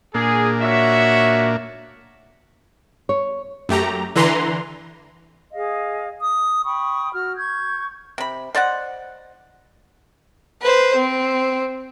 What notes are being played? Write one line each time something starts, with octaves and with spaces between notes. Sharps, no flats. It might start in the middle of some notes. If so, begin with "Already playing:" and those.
A#2 A#3 D4 G#4
F#4 C#5 E5
C#5
F#2 A3 G4 A#5
D3 E3 B4 A#5 C6
G#4 D#5 F5
D#6
G5 B5 C#6 D#6
F#4 F6
C#6 G6 G#6
C3 B5
C5 D5 D#5 F#5
B4 C5
C4